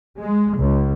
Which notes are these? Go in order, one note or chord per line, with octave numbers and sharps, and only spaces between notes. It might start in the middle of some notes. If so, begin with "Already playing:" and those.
G#3
C#2